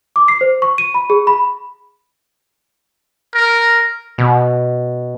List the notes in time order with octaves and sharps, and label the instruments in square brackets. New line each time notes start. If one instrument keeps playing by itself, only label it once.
[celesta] D6
C7
C5
C#6
D#7
B5
G#4
B5
[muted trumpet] A#4
[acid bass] B2